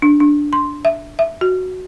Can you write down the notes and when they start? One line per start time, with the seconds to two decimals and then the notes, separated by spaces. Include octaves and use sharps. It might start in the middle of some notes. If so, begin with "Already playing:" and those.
0.02 D4
0.20 D4
0.53 C6
0.85 E5
1.19 E5
1.41 F#4